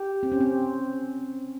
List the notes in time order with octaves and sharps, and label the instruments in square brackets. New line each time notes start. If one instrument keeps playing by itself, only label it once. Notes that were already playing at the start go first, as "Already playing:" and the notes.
Already playing: [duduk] G4
[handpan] C4
C#4
C4